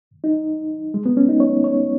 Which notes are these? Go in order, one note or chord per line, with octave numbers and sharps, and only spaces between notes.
D#4
G#3
B3
C#4
D#4
C#5
C#5